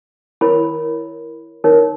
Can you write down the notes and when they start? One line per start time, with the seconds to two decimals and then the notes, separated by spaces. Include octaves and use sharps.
0.41 E4 A#4 C#5 B5
1.64 D#4 A#4 C#5